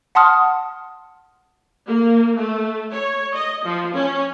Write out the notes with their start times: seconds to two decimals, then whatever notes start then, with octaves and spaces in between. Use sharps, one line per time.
0.15 F#5 A5 C6 D#6 F6
1.87 A#3
2.37 A3
2.91 C#5
3.34 D#5
3.65 F3
3.95 C#4